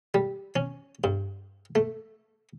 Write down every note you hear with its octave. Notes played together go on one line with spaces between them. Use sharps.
G3
C#4
G2
A3